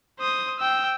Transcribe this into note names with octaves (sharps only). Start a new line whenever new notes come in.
C5 D#6
G5 E6